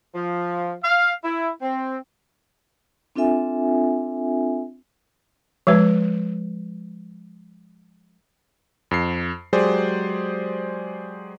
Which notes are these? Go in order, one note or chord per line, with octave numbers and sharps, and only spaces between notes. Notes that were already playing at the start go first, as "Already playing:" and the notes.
F3
F5
E4
C4
C4 D4 F4 A4 E5 G#5
F3 G#3 B4
F2 C7
F#3 G#3 G4 G#4 C5 D5